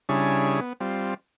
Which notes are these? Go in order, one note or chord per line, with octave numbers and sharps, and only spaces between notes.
C#3 G3 D4 E4 G#4 C#5
B3
G3 C4 F4